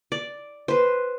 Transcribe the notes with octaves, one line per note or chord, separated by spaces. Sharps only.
D5
B4 C5